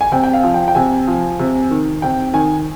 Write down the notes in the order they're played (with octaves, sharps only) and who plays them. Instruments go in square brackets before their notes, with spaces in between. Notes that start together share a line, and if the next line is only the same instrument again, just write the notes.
[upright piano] G#5
C3 G5
G5
F5
F3
G5
G5
C3 G#5
F3
C3
D#3
C3 G5
D#3 G#5